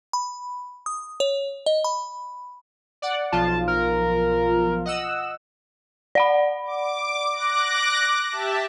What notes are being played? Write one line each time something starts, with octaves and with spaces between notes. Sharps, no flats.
B5
D#6
C#5
D#5
B5
D5 F#5
B1 F3 F4 A5
A#4
D#5 F#5 E6
D5 F#5 B5
D6
D6 F#6 A#6
G4 E5 A5